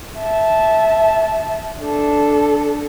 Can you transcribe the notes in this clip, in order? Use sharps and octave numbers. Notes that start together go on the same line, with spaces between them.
E5 A5
D4 A4